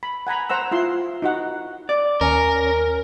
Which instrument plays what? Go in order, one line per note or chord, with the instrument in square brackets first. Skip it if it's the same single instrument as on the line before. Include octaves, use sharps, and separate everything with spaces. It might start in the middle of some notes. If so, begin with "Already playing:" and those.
[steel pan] B5
F#5 G#5 A#5 B5
C5 F#5 A#5 E6
E4 F4 C6
D#4 F#4 F#5
[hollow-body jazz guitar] D5
[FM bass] D#2 [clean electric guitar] C#4 [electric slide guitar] A#4